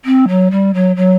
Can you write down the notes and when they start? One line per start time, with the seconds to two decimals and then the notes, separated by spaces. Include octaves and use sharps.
0.05 C4
0.28 F#3
0.51 G3
0.74 F#3
0.96 F#3